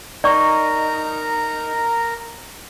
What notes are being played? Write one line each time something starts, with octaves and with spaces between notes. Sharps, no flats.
D#4 A#4 D5 A#5 C#6